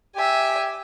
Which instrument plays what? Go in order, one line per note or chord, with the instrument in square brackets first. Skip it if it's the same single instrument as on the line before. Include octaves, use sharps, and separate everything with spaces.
[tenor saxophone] G4 [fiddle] E5 G#5